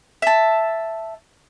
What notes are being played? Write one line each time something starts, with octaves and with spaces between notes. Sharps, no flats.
E5 A5